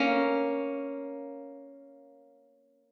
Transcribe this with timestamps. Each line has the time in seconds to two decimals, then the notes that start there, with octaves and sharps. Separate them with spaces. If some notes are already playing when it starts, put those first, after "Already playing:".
Already playing: A#3 C#4